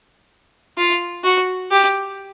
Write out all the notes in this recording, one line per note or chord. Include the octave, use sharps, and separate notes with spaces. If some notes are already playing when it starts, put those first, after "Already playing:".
F4
F#4
G4